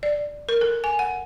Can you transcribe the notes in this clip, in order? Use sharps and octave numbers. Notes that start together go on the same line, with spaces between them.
D5
A#4
A4
G#5
F#5